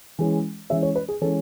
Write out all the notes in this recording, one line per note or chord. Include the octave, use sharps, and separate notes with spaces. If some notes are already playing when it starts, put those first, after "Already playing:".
E3 G#3 C#4
E3 G#3 C#4 E5
C#5
B4
G#4
E3 G#3 C#4 A4